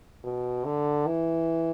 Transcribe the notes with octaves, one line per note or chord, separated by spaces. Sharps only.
B2
D3
E3